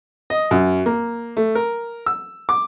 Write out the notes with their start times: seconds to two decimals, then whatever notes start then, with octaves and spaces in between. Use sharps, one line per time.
0.30 D#5
0.51 F#2
0.86 A#3
1.37 A3
1.55 A#4
2.06 E6
2.49 D6